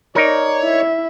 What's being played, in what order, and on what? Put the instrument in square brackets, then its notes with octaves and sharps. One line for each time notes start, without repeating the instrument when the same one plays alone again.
[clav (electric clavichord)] D#4 A#4 [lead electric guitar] C#5 [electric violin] D5
[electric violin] E4 E5